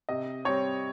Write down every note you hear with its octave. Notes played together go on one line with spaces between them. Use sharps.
C3 D#5
G3 C4 C#5